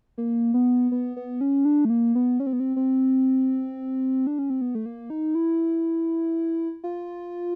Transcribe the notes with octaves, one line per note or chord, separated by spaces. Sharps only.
A#3
B3
B3
B3
C#4
D4
A3
A#3
B3
C#4
C4
B3
C4
C4
D4
C#4
C4
B3
A3
A#3
D#4
E4
F4